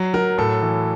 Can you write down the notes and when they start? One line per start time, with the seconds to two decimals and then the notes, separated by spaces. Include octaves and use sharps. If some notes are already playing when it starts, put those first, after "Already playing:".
Already playing: F#3
0.14 F#3 A#4
0.38 A2 A4
0.62 E3